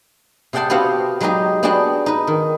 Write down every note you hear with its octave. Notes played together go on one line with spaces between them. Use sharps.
C3 G#4 F#5 G5 A5 C6
B3 C4 F#4 G4 C#5 F5
F#3 G#3 B3 D#4 G4 G#4
B3 D4 F#4 G#4 G5 A5
D#4 B4
D#3